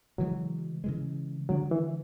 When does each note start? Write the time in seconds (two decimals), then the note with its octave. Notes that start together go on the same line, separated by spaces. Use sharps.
0.18 C#3 E3 F#3 G#3
0.84 C#3 E3 G#3
1.49 D3 F#3 G#3 D4
1.71 E3